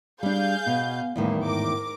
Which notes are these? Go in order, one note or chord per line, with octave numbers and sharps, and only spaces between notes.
G3 D4 G#4 F5 G6
B2
E2 A2 D#3 G3 A#3
G#2 A#4 D6